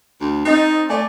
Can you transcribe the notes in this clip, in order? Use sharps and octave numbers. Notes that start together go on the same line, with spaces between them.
D2
C4 D#4 D#5 A6
A3 D5 G#5